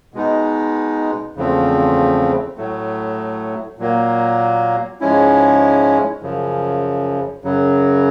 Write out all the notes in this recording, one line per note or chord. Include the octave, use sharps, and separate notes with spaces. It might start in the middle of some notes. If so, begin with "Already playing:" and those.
B2 G#3 B3 D#4
E2 C#3 F3 A3 C4
A2 F#3 A3
A#2 F#3 A#3
G#2 F3 G#3 C#4 E4
F#2 C#3 F3
F#2 C#3 F#3